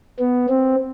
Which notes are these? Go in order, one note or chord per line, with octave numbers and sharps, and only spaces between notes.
B3
C4